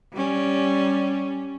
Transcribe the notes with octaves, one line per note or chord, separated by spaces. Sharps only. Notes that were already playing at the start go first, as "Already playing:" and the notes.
G3 C#4